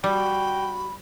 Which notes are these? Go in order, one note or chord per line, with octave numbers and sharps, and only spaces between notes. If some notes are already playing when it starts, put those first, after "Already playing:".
G3 F#4 G5 B5